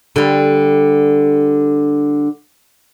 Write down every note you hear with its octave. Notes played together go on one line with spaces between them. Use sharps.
D3 G3